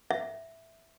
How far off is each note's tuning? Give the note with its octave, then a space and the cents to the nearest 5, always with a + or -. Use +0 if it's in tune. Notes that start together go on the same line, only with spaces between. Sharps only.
E5 +0